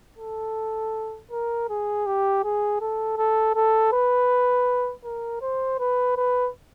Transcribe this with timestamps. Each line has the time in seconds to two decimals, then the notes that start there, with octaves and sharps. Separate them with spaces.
0.19 A4
1.31 A#4
1.69 G#4
2.06 G4
2.44 G#4
2.81 A4
3.17 A4
3.55 A4
3.92 B4
5.04 A#4
5.41 C5
5.79 B4
6.16 B4